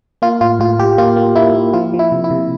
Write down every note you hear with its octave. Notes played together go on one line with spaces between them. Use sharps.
A#3 F4
A2 F4
A2 F4
A2 G4
A#3 F4
A#3
A#3 E4
A#3
F3 F4
F3
E4
C3
E4
C3